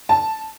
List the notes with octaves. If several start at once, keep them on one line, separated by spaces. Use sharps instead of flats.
A5